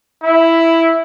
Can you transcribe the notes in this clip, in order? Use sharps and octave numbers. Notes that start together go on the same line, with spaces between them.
E4